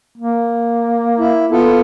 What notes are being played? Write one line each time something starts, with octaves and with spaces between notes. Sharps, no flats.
A#3
E4
B3 F4 A4